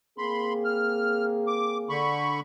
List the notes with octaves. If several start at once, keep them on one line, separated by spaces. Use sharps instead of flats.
A#3 C4 G#4 B5 C6
F6
D6
D3 B5 C#6